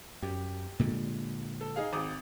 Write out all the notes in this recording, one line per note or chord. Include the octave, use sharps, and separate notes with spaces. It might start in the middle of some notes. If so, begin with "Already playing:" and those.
F#2 G4
A#2 D3 G#3
A4
D#4 G#4 F5
G#1 D6 D#6